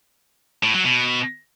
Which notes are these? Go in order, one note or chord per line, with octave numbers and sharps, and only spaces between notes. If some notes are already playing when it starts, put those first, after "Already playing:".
A2
F#3
B2